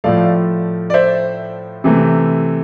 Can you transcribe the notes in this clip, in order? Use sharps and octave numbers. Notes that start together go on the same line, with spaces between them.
A2 F3 A3 D5 F5
D5
C5 E5
C3 E3 A3